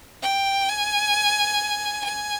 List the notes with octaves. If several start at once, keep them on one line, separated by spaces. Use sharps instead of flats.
G5
G#5
G#5